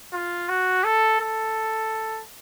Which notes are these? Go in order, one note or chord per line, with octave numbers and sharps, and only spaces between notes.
F4
F#4
A4
A4